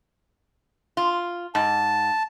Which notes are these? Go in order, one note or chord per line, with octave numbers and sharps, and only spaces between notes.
F4
G#2 A5